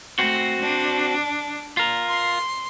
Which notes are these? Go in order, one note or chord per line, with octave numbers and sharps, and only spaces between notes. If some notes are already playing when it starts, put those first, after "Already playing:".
A3 C4 F#4
D4
F4 A#4
C6